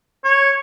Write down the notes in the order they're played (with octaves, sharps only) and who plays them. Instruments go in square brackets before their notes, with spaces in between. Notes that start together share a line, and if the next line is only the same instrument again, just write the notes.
[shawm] C#5